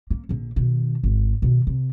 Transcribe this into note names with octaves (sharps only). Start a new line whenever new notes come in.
A#3
A#1 D3
B2 D#3
G#1
B2 D#3
C3